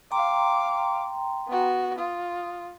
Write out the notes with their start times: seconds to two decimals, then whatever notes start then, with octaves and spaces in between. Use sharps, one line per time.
0.12 F5 G5 A#5 C6 D6
1.48 B3 F#4
1.98 F4 D#6